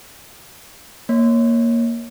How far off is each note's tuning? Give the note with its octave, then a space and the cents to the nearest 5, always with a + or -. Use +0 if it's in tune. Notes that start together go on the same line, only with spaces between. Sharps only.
A#3 +0 C#5 +0